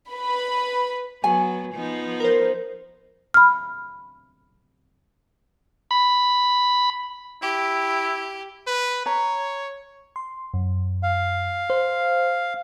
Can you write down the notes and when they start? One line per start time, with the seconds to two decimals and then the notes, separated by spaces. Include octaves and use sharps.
0.11 B4 B5
1.24 F#3 B3 G#5
1.74 F3 B3 D#4
2.20 A#4 C5
3.34 B5 F6
5.91 B5
7.42 E4 G4
8.67 B4
9.06 C#5 A#5
10.16 C6
10.54 F#2
11.03 F5
11.70 C5